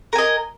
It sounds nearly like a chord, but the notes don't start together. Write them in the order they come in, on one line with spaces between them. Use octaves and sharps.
A#4 G#5 D#5